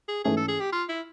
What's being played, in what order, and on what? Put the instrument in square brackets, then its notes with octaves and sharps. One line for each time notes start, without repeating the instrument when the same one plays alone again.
[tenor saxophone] G#4
[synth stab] G#2 E3 A3 C#4 [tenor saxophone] G#4
[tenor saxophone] A4
G#4
G4
F4
E4